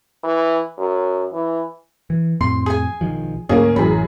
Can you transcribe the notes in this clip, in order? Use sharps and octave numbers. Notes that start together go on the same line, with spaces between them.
E3
F#2
E3
E3
F2 A2 C4 C6
G#4 G#5
B1 D#3 F3
D2 G#2 A#3 C#4 G#4
A1 F#2 E3 G#4 B5